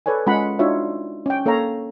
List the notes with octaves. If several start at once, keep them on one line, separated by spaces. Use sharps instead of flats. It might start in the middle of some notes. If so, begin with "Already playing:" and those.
A4 B4 C#5 D5 G#5
G#3 C#4 F4 G#4 F#5 B5
D4 D#4 F4 F#4 C#5 E5
C#4 G5
A#3 A4 C#5 F5 A#5